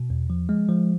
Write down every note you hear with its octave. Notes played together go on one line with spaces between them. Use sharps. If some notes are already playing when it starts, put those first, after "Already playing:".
Already playing: B2
E2
F3
G#3
F3